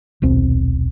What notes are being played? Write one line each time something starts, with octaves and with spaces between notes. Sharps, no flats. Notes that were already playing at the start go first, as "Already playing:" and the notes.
D#1 B1 C4